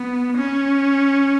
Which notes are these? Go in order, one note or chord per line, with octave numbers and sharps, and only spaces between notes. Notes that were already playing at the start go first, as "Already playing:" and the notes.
Already playing: B3
C#4